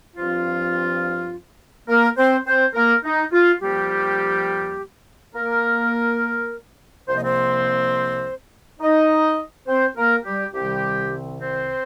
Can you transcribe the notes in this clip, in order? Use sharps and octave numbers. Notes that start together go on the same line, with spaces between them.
G2 F3 C4 F4
A#3 A#4
C4 C5
C4 C5
A#3 A#4
D#4
F4
F2 F3 G3 A#3 G4
A#3 A#4
C2 C3 F3 A#3 C5
D#5
C4 C5
D#4 D#5
C4 C5
A#3 A#4
G3 G4
C2 C3 D#3 G3 C4 G4
C4 C5